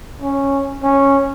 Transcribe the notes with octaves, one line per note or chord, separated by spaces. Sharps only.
C#4
C#4